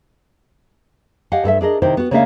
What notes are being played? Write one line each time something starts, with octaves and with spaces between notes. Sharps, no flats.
G4 D#5 F5 F#5 G#5
G2 A4 B4 E5
D4 G#4 A#4 D#5
C3 D#3 E4 C5 G5
B3 F#4
C#3 G#3 A#3 D4 E5 F5